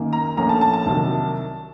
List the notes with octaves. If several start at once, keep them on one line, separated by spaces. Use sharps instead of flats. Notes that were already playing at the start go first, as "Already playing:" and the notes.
Already playing: F#1 F#2 D#3 A#3
A#5
A#1 A#2 F3 A3 C#4 A#5
A5
A5
A5
C2 C3 D#3 F#3